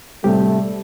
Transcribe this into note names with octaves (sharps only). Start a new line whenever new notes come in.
A2 C3 G3 A3 G4